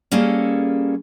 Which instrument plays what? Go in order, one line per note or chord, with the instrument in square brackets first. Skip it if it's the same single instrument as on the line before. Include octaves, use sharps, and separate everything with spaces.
[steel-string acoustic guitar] G3 A#3 C#4 G#4 A4